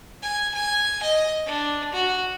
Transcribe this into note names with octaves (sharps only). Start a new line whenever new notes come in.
G#5
G#5
D#5
D4
F#4